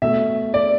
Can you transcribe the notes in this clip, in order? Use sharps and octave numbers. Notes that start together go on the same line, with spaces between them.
B2 A3 E5
D5